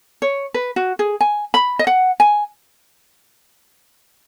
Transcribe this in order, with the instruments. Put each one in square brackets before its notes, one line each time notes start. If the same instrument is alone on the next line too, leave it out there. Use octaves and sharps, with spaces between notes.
[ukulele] C#5
B4
F#4
G#4
G#5
B5
D#5
F#5
G#5